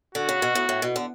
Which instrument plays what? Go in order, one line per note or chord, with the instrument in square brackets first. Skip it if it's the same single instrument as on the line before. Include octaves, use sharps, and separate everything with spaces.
[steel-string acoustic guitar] D3 [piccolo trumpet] F#4
[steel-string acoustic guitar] C#3
B2
A2
A2
B2
D3